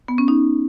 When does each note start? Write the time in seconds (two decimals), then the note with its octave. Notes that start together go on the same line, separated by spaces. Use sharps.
0.08 B3
0.18 C#4
0.28 D#4